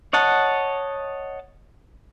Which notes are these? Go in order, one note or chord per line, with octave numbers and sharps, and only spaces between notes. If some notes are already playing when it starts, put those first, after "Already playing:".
C#5 D#5 F#5 A5